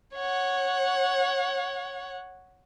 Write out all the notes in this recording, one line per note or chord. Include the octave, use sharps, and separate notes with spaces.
C#5 F#5